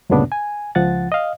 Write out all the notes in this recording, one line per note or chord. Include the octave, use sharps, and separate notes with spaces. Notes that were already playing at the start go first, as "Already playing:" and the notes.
D2 G2 A#2 C#3 B3 D4
G#5
C#2 F3 F#5 A6
D#5 F5